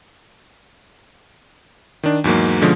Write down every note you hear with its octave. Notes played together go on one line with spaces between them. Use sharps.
D#3 D4
E2 G#2 F#3 A#3
B2 D3 F3 G#3 C#4